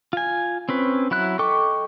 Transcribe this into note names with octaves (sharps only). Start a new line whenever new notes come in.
F4 G#5
C4 C#4 B4
F#3 E4 B5 F#6
A4 D#5 G5 C#6 D6